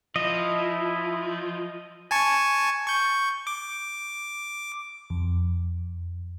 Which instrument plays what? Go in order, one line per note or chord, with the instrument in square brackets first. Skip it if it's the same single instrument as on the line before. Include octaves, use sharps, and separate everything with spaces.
[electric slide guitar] F3 [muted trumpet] E4 [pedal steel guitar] D#5
[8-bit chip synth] G#5 A5 C#6
C#6 G6
D6
[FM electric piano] F2